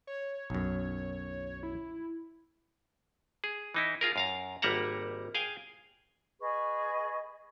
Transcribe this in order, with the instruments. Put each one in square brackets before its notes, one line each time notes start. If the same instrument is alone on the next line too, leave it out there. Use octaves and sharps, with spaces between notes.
[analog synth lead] C#5
[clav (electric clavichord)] B1 F#2
[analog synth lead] E4
[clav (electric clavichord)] G#4
E3 D#4 E4
F4 G#4 A#4
F#2 F5 A#5
G#1 G3 A#3 E5 F#5 A#5
G#4 F5 G5 G#5
[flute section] G#4 B4 D#5 C#6